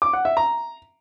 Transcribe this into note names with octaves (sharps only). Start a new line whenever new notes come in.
D6
F#5
E5
A#5